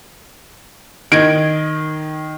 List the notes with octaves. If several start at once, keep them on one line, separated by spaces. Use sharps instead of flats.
D#3 D#5 G#6 D7